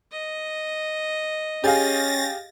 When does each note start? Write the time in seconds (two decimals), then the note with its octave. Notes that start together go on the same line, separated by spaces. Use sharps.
0.12 D#5
1.64 C#4 G4 G#4 F5 A6 A#6